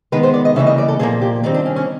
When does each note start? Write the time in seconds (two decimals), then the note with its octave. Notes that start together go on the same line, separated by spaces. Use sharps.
0.12 D#3 G#3 B3 B4
0.23 C5
0.34 D5
0.45 D#5
0.56 C#3 E3 G3 A#3 E5
0.67 D#5
0.78 D5
0.88 A4
0.99 A#2 F3 A#3 G#4
1.22 G4
1.43 D#3 G3 C4 D#4
1.54 D4
1.66 C#4
1.76 C#4